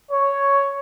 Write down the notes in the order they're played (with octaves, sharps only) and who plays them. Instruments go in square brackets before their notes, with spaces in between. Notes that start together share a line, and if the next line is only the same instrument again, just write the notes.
[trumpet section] C#5